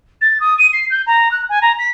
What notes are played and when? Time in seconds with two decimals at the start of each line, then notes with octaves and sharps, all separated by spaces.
0.21 A6
0.40 D#6
0.58 D#7
0.73 C7
0.90 G6
1.06 A#5
1.31 F#6
1.49 G#5
1.61 A#5
1.78 B6